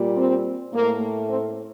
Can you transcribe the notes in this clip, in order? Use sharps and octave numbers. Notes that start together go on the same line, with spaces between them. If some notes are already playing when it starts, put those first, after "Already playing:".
Already playing: A#2 G3
C4
A2 A3 A#3
C4